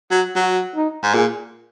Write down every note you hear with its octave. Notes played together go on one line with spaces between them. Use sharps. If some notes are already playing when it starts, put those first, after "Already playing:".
F#3
F#3 F#4
D#4
G#2
A#2 G#4